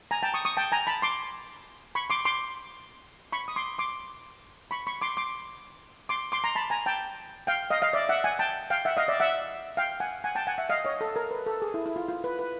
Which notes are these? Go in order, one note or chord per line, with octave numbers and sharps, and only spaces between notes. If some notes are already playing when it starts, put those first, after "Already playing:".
G#5 A#5
G5 A5
C#6 D#6
C#6 D#6
G5 A5
G#5 A#5
A5 B5
C6 D6
B5 C#6
C6 D6
C6 D6
B5 C#6
D#6
C6 D6
C6 D6
B5 C#6
B5 C#6
C6 D6
C6 D6
C6 D6
C6 D6
A#5 C6
A5 B5
G#5 A#5
G5 A5
F5 G5
D#5 F5
D#5 F5
D5 E5
E5 F#5
F#5 G#5
G5 A5
F5 G5
E5 F#5
D#5 F5
D5 E5
E5 F#5
F5 G5
F#5 G#5
F#5 G#5
G5 A5
F#5 G#5
E5 F#5
D#5 F5
C#5 D#5
A4
A#4
B4
A4
G#4
E4
E4
F4
F4
B4
B4